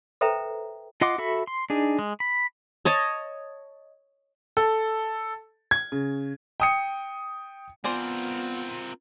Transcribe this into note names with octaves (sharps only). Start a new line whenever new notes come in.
A4 B4 C5 E5 G5 A#5
F4 D#5 F#5 C6 D6
F#4 A4 E5 B5
C6
D4 D#4 G#4
G#3
B5
C#5 D#5 A5
A4
G#6
C#3
G5 D#6 C#7
B3 C4 F4 A#4 C5 D5 G#5